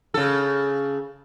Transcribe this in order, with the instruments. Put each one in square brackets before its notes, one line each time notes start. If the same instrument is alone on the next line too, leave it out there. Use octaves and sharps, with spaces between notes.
[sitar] C#3 A4